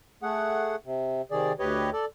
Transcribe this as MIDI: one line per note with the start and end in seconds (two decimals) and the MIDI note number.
0.23 0.76 57
0.23 0.76 68
0.23 0.76 78
0.85 1.22 48
1.31 1.52 48
1.31 1.52 51
1.31 1.52 68
1.31 1.52 74
1.59 1.90 38
1.59 1.90 67
1.59 1.90 71
1.59 1.90 73
1.59 1.90 75
1.93 2.05 69
1.93 2.05 74